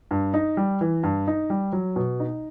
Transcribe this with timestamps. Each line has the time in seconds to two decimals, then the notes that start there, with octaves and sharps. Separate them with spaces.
0.11 G2
0.34 D#4
0.57 G3
0.81 E3
1.03 G2
1.27 D#4
1.50 G3
1.73 F#3
1.96 B2
2.20 D#4